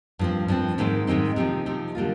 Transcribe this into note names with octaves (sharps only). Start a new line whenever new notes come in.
G2 F3 C4
G2 F3 C4
G#2 D#3 G#3 C4 D#4
G#2 D#3 G#3 C4 D#4
C3 F3 C4 D#4
C3 F3 C4 D#4
D3 G3 A#3 F4